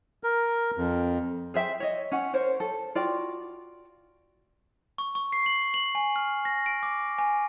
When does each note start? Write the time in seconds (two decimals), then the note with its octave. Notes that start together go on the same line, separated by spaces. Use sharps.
0.24 A#4
0.77 F2
1.54 G#4 C5 E5 G5
1.80 C#5 D#5
2.12 C#4 F#5
2.33 A#4 C5 C#5
2.60 A4
2.95 F4 F#4 D5 G5
4.98 C#6
5.15 C#6
5.33 C7
5.46 F#7
5.74 F#7
5.95 G#5
6.16 F6
6.45 A#6
6.66 D7
6.83 D6
7.18 G#5